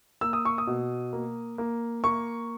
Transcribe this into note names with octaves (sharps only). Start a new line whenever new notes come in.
A#3 E6
D#6
C#6
D#6
B2
A#3
A#3
A#3 C#6